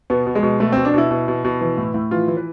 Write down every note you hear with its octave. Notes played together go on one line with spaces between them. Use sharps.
B2 B3
B2
G#3
B2
B2 A3
B2 C4
D4
B2 E4
B2
B2
B2
E3
A2
A2
E3 F4
E3
B4